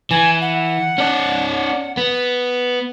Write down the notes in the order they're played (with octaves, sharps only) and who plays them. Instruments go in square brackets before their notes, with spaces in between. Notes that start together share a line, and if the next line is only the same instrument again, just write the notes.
[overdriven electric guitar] E3 [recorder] G#5
[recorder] F#5
[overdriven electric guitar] C#4 D5
B3